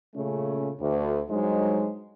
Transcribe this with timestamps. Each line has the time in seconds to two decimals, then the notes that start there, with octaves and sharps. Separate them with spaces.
0.16 A#2 C#3 A3 C#4
0.81 D2
1.30 G2 F#3 G#3 D#4 C5